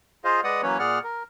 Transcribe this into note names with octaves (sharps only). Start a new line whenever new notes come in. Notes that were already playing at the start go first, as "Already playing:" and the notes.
F4 G#4 C5 D#5 F5
G#3 B4 D5 D#5 F#5 D#6
E3 F#3 A#3 C#4 B4 C#5
A#2 G#4 D5 F#5 F6
A#4